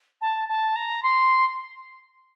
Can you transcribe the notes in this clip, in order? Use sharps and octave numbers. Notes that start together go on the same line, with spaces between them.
A5
A5
A#5
C6